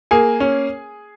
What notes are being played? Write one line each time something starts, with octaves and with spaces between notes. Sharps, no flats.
A#3 G#4 G#5
C#4